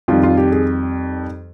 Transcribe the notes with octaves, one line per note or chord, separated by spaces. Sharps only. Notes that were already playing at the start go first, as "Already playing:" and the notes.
F2 D#3 G3 F4
F4
G4
G#4